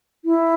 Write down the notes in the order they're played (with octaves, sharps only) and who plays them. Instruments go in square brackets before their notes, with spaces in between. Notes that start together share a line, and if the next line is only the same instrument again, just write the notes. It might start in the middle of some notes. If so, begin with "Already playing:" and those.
[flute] E4